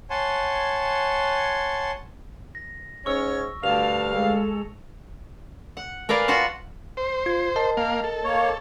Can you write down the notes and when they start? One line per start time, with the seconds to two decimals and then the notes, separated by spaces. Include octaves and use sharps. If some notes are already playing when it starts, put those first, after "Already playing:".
0.10 C#5 F#5 G#5 A5 C6
2.55 A#6
3.06 G#2 C#4 C#5 C#6 E6
3.63 D2 G2 F5 A5 F7
4.11 G#3 A4
5.77 F#5
6.09 A#4 B4 D5 F5 G#5
6.28 F4 F#4 F#5 A5
6.97 C5
7.26 F4 G#6
7.56 A#4 D#5 A5
7.77 A#3 F5
8.04 A4
8.24 A#3 C#5